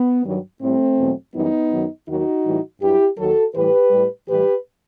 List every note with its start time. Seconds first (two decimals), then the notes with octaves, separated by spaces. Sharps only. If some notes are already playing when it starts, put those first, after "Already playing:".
Already playing: B3
0.24 G2 D#3 F#3
0.61 A2 G3 A3 C4
0.98 E2 B2 F#3
1.34 F#2 E3 G3 B3 D#4
1.71 F#2 D#3 F#3
2.07 D#2 D#3 F#3 D#4 F#4
2.45 A2 E3 G3
2.81 G2 F#3 E4 G4
3.18 D#2 D#3 F#3 F#4 A4
3.55 A2 E3 G3 G4 B4
3.91 A2 G3
4.28 A2 E3 G3 G4 B4